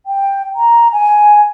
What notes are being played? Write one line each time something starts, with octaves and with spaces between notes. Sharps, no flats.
G5
A#5
G#5